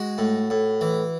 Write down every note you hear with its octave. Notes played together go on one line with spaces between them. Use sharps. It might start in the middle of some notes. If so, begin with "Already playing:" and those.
Already playing: G#3 F#4
A2
A2
E3